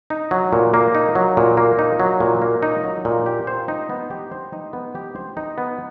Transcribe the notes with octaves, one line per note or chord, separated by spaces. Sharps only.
D#4
F#3
A#2
A#3
D#4
F#3
A#2
A#3
D#4
F#3
A#2
A#3
D#4
F#3
A#2
G4
C5
D#4
B3
G4
C5
D#4
B3
G4
C5
D#4
B3